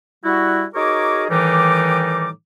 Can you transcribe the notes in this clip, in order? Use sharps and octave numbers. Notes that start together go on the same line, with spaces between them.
G3 E4 F#4
D#4 F#4 G#4 A#4 C#5 D6
A2 D#3 E3 G3 D#4 D6